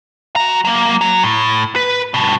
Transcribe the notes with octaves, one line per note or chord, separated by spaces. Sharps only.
F#4 A#5
F#3 A#3
F#3
A2
B4
G2 B2